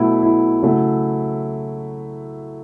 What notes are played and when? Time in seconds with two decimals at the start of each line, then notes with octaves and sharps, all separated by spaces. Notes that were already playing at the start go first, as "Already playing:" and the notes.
Already playing: B2 F#3 A3 E4
0.23 E4
0.63 C#3 F#3 A3